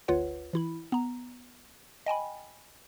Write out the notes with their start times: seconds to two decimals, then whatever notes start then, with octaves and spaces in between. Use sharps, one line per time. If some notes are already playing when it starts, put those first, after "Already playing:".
0.08 G1 D2 F4 B4 C#5 F#5
0.53 E3 E4 B5
0.92 B3 A#5
2.06 D#5 G5 G#5 B5